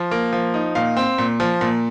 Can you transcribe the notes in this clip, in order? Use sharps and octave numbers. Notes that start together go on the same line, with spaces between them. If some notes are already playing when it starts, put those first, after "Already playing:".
Already playing: F3
A#3
F3
D#4
A#2 F5
C4
A#2
F3
A#2